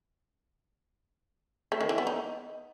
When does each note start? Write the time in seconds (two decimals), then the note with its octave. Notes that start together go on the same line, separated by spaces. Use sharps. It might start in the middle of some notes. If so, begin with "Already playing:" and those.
1.72 A3
1.81 D#3
1.89 E3
1.98 B3
2.07 D#4